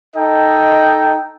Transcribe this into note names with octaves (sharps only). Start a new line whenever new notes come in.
D#4 A4 D#5 G5